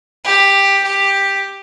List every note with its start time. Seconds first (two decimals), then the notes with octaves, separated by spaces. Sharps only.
0.25 G4
0.84 G4